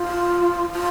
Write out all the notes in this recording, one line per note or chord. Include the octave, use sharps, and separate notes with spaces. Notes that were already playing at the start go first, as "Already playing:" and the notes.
Already playing: F4
F4